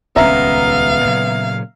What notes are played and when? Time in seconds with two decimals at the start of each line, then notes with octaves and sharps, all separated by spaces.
0.16 D#1 C#2 B3 C#4 E5 F5 A#5
1.05 A#2 C#3 F#3